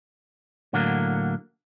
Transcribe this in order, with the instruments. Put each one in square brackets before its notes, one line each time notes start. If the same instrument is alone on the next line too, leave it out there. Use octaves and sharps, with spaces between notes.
[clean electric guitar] A2 D3 F#3 A#3